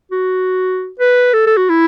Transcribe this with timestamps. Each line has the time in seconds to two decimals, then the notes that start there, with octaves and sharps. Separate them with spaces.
0.11 F#4
0.99 B4
1.34 A4
1.46 A4
1.57 F#4
1.69 E4